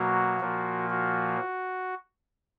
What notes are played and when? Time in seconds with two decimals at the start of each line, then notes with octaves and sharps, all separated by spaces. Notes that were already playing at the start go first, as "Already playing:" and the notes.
Already playing: B2 F#3 A#3 F#4
0.40 A#2 F3 A#3
0.90 F#4